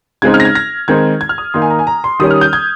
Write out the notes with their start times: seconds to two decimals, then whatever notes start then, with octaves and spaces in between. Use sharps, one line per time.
0.22 C#3 G#3 C4 D#4 G#6
0.34 F6
0.40 A#6
0.45 G#6
0.55 A#6
0.88 D#3 G#3 C4 D#4 G#6
1.21 G#6
1.29 F6
1.38 D#6
1.54 D#3 A#3 D#4 C6
1.62 G#5
1.70 A#5
1.79 G#5
1.87 A#5
2.04 C6
2.19 D#3 G3 C#4 D#6
2.31 F6
2.41 G6
2.53 G#6